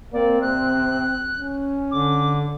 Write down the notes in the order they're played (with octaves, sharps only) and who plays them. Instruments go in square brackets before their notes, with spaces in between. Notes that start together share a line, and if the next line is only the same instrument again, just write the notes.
[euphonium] A#3 [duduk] C4 [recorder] D5
[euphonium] C3 [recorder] F#6
[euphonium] C#4
[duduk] D3 [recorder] D6